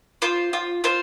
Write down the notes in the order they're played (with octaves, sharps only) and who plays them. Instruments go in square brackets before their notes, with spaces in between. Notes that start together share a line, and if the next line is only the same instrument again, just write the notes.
[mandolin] F4 C5
F4
F4 C5